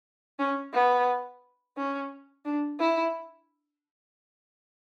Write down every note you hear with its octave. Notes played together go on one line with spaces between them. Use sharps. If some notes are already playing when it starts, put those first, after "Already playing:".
C#4
B3
C#4
D4
E4